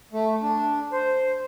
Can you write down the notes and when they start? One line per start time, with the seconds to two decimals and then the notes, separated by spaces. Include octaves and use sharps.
0.13 A3
0.42 D4
0.92 C5